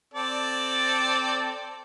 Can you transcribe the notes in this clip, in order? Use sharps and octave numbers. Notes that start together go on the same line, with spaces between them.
C4 A4 D5